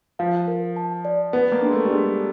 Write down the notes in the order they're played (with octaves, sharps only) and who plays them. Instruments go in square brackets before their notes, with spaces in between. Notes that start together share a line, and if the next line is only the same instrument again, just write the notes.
[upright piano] F3 [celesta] F5
[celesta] A#4
A5
D5
[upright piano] B3 [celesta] B4
[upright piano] A#3
[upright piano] G#3 [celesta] D4
[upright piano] A3
G3
[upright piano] G#3 [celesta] D4